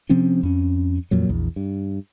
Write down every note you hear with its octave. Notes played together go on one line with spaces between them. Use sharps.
C3 F3 C4 C#4
F2 C#4
F2 A#2 F#3
A#1 E2
G2